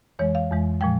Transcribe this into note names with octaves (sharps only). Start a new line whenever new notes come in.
F2 E3 G#3 C#5
F5
F2 E3 G#3
A#2 F3 G#3 G5